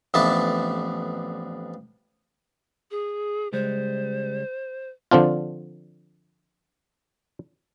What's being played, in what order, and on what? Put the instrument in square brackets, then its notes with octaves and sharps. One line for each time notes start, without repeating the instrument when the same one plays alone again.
[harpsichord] A1 F2 B3 D4 E5 A5
[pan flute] G#4
[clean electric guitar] C#2 G3 G#3 [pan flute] C5
[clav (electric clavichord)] D3 F3 C4 D4 F4